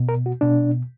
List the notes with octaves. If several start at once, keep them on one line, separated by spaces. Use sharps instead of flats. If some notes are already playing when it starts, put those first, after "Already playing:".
Already playing: B2
A#4
F#4
B2 D4